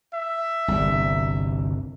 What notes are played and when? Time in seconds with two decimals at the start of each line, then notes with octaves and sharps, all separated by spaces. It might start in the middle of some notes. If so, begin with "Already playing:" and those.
0.14 E5
0.68 G1 C2